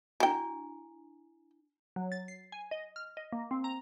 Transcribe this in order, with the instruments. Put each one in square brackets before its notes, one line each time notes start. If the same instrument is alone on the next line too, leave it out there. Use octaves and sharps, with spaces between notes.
[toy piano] D4 E4 G#5 [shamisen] F#4 G5
[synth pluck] F#3
A6
C7
G#5
D#5
F6
D#5
A#3
C4
A#5